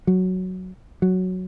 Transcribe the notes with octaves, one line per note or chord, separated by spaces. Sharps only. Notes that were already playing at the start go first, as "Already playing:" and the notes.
F#3
F#3